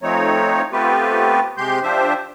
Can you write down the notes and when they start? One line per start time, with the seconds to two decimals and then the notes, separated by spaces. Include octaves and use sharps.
0.03 F3 A3 C4 D#4 C#5
0.72 A3 B3 C4 F4 G4 B4
1.57 C3 G#3 G4 C6 G6
1.82 F3 D4 G4 C5 E5